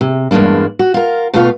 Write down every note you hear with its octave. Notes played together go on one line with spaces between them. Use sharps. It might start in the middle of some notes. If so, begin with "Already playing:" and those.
C3
E2 G2 G#3 A#3 D4
F#4
F4 A#4
B2 A3 B3 F4 D#5 F5